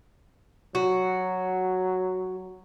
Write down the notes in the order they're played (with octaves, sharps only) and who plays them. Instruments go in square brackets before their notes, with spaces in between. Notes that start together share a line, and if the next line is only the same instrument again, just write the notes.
[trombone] F#3 [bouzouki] F#4